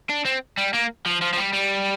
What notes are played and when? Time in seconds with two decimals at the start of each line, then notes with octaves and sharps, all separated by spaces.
0.10 D4
0.26 C4
0.57 G3
0.74 A#3
1.06 F3
1.21 F3
1.33 F3
1.37 G3
1.53 G3